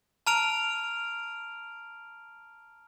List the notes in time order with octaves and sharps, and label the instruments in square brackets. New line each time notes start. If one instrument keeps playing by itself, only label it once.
[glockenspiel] A5 A#5 F6 D7 F7